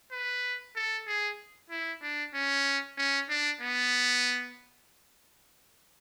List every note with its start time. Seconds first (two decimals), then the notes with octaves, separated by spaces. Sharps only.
0.12 B4
0.76 A4
1.07 G#4
1.70 E4
2.02 D4
2.34 C#4
2.98 C#4
3.29 D4
3.61 B3